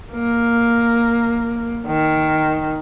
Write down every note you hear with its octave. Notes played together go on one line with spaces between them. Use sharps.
A#3
D#3